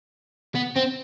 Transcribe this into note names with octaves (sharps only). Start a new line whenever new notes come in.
B3
C4